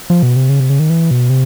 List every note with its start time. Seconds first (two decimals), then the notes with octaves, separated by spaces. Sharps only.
0.10 F3
0.23 B2
0.36 C3
0.49 C#3
0.60 C3
0.70 C#3
0.79 D#3
0.90 E3
1.11 B2
1.30 C3